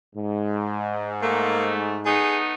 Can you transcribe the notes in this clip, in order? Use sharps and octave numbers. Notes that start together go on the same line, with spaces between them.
G#2
A3 A#3
A3 B3 D#4 G#4